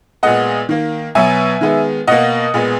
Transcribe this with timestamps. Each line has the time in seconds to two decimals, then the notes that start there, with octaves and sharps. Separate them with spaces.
0.23 A#2 G#3 B3 D#5 F#5
0.69 D#3 A#3
1.15 B2 F#3 B3 E5 G#5
1.61 D#3 G#3 B3
2.07 B2 A#3 D#5 F#5
2.54 A#2 G#3 B3